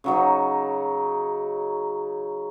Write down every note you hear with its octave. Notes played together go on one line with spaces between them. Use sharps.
C#3 F#3 D#4